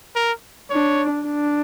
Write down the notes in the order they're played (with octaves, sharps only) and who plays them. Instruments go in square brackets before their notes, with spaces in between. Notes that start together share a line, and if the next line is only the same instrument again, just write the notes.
[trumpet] A#4
[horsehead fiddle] D4 [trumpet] C#5
[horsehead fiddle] D4